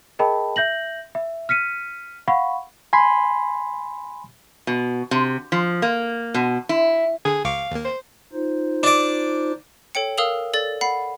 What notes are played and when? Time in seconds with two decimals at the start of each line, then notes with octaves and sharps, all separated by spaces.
0.19 G#4 A#4 D#5 G5 A5 B5
0.56 E5 G6 A#6 F#7
1.15 E5
1.49 F6 B6 C#7 D#7
2.28 F5 F#5 B5 C#6
2.93 G#5 B5 C6
4.67 B2
5.11 C3
5.52 F3
5.82 A#3
6.34 B2
6.69 E4
7.25 D3 G#4
7.45 C#2 F5 C#6 D6
7.71 D#2 A#3
7.84 C5
8.33 D#4 F4 C5
8.83 D4 D5
9.95 A4 C#5 G5 C#7
10.18 A#4 F5 D#6 E6 F7 F#7
10.54 A4 D5 A6
10.81 F#5 B5 C7